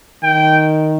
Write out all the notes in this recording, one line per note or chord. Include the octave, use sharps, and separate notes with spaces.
D#3 G5